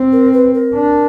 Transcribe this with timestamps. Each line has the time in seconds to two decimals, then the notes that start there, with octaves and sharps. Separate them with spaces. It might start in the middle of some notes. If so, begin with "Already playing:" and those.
Already playing: C4
0.12 A#4
0.33 B4
0.54 A#4
0.75 D4